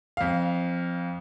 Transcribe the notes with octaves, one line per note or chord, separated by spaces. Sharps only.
F2 F5